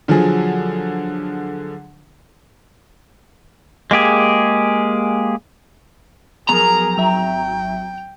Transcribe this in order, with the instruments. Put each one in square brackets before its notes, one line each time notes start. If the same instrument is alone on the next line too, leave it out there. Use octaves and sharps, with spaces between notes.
[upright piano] D3 F3 F#3 G#4
[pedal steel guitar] G#3 A#3 G4 G#4
[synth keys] F3 F#3 B3 [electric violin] G#4 A#4 [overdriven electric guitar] A#5
[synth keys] G#1 F#3 E5 [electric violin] G5